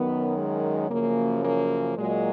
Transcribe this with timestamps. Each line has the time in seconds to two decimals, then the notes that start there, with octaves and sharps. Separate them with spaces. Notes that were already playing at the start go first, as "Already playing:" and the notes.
Already playing: F#2 D#3 F#3 B3
0.38 G#3
0.90 F#2 C#3 F3 A#3
1.44 A#3
1.97 A#2 F#3 G#3